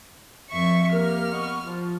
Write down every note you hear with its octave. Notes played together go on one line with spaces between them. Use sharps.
F2 E5 C#6
A#3 G4 A#4 F6
B3 D#5 C#6
F3 F4